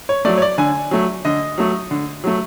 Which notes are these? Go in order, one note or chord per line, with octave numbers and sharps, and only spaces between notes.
C#5
F#3 A3 D5
C#5
D5
D3 G#5
F#3 A3
D3 D#5
F#3 A3
D3
F#3 A3